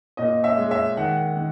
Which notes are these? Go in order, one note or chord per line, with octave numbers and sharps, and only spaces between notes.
A#2 D#5
E5
G#3
E5
D#3 F#5
D#3